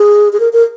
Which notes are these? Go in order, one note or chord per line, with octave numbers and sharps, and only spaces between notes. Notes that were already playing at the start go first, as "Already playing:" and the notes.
Already playing: G#4
G#4
A#4
A#4